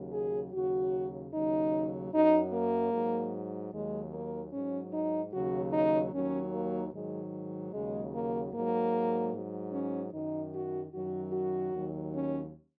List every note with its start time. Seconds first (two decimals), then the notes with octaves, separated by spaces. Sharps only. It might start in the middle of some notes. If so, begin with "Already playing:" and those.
Already playing: D#2 C#3 F#3
0.12 G#4
0.53 D#2 C#3 F#3 F#4
1.33 D#2 C#3 F#3 D#4
2.12 F#2 F#3 D#4
2.53 A#3
2.93 G#2 F#3
3.73 D#2 D#3 F#3 G#3
4.13 A#3
4.52 G#2 F#3 C#4
4.93 D#4
5.33 D#2 C#3 F#3 F#4
5.73 D#4
6.12 D#2 D#3 F#3 C#4
6.53 A#3
6.93 G#2 D#3 F#3 G#3
7.73 D#2 C#3 F#3 G#3
8.13 A#3
8.53 G#2 F#3 A#3
9.33 G#2 F#3
9.73 C#4
10.13 F#2 D#3 F#3 D#4
10.53 F#4
10.93 F#2 D#3 F#3 F#4
11.33 F#4
11.73 D#2 D#3 F#3
12.13 C#4